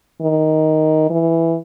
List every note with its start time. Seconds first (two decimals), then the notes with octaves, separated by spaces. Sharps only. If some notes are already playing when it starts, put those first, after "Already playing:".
0.21 D#3
1.10 E3